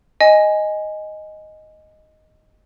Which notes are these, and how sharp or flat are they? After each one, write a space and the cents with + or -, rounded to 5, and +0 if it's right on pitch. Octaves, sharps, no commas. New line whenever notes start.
D#5 +0 G#5 +0